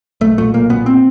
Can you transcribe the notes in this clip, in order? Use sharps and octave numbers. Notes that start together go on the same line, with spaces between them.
B1 A3
A#2 A3
B1 A#3
A#2 B3
C4